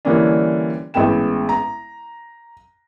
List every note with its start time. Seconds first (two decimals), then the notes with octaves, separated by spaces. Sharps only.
0.05 D3 E3 G3 A#3 C#4 D4
0.94 A1 G#3 B3 G5 E7
1.49 A#5